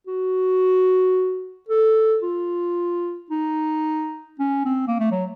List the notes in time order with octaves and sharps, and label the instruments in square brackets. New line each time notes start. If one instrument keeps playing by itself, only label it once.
[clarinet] F#4
A4
F4
D#4
C#4
C4
A#3
A3
F#3